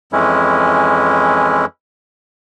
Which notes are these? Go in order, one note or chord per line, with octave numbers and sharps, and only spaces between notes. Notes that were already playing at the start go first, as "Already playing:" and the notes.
F2 E3 G#3 C#4 E4